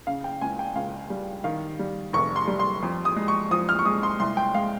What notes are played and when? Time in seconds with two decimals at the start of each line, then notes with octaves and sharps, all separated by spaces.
0.07 C#3 F5
0.24 G5
0.41 C#2 G#5
0.59 G5
0.75 C#2 F5
1.10 G3
1.44 D#3 F5
1.79 G3
2.13 F1 C#6
2.36 C6
2.48 G3
2.59 C6
2.83 F2
3.05 D#6
3.16 G#3
3.28 C#6
3.51 F3 D#6
3.69 F6
3.79 C#6
3.85 G#3 D#6
4.03 C6
4.20 C2 C6
4.37 G5
4.54 G#3 F5